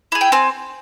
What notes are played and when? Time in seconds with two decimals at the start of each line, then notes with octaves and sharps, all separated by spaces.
0.12 E4 G#4
0.21 G5
0.32 C4 G#5